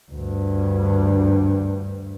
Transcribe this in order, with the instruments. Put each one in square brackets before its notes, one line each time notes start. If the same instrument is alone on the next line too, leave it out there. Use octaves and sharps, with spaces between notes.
[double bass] D2 G2